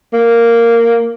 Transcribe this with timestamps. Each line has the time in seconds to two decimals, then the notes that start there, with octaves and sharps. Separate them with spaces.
0.13 A#3